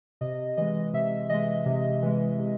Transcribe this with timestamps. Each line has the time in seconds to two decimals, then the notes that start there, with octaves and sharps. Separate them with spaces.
0.21 C3 D#5
0.57 E3 G#3 D#5
0.93 C3 E5
1.29 E3 G#3 D#5
1.66 C3
2.02 E3 G#3
2.39 C3